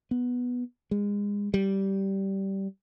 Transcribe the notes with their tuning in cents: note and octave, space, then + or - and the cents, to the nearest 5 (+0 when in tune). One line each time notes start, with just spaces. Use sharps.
B3 -5
G#3 -30
G3 -15